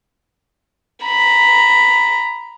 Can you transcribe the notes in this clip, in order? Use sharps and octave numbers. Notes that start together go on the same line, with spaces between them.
A#5 B5